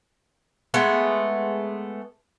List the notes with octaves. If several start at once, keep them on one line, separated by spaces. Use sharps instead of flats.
G#3 A3 B3